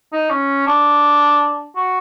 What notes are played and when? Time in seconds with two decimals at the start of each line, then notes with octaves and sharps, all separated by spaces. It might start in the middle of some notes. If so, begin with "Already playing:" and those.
0.13 D#4
0.30 C#4
0.67 D4
1.76 F#4